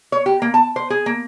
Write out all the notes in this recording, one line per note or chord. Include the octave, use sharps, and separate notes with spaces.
C#5
G4
A#3
A5
C5
G#4
A#3